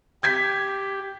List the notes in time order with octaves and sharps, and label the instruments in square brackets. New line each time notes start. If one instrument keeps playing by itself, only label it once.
[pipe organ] G4 [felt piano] G6 G#6 B6